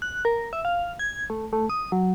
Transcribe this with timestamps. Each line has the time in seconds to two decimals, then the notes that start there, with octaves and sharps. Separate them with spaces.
0.02 F#6
0.25 A#4
0.53 E5
0.65 F5
0.99 G#6
1.30 A3
1.53 A3
1.70 D#6
1.92 F#3